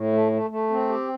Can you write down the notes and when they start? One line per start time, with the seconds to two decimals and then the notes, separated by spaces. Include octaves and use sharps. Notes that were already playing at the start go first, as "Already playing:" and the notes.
Already playing: A2
0.13 A3
0.32 A3
0.50 A3
0.70 C4
0.89 G4